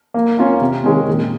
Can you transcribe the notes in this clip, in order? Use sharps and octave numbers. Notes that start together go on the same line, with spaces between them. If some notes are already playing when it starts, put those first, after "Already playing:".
A#3
C#4 F4 A#4
C3
D#3 G#3 C#4
A#2